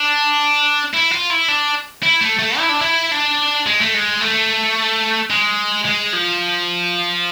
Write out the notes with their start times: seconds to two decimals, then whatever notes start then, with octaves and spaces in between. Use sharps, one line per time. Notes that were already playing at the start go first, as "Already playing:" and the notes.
Already playing: D4
0.94 E4
1.11 F4
1.30 E4
1.48 D4
2.03 E4
2.21 A3
2.39 A3
2.58 E4
2.69 D4
2.82 E4
3.12 D4
3.66 G#3
3.81 A3
3.94 G#3
4.21 A3
5.30 G#3
5.85 G#3
6.13 F3